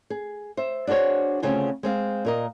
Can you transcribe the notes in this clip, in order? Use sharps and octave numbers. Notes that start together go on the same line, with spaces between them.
G#4
C5 E5
D4 F#4 G#4 C5 C#5
D2 C#3 C4 F4 G#5
G#3 C4 F5
A#2 A#4 D#5